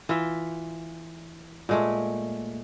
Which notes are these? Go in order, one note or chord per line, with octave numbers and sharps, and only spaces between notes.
E3 F4 E5
A#2 G#3 A3